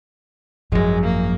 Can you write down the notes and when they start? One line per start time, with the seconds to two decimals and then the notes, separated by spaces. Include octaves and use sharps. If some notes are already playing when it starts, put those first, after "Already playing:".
0.72 G#1 F#2 F3 G#3
1.04 A#3